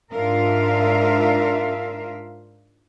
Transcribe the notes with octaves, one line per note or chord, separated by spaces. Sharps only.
G#2 D4 F4 A#4 E5 F5